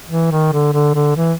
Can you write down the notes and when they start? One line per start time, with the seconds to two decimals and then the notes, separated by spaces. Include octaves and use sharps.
0.09 E3
0.31 D#3
0.52 D3
0.73 D3
0.95 D3
1.16 E3